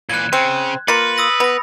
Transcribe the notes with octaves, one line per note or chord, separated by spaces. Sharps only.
A#2 E3 F#6 G#6
C#3 C4
A#3 F4 B4 A6 A#6 C#7
D#6 E6 A#6
B3 B5 A#6